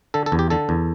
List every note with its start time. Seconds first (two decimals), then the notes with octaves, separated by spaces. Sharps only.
0.14 D3 A4
0.26 A4
0.32 E2
0.39 G4
0.50 D3 A4
0.69 E2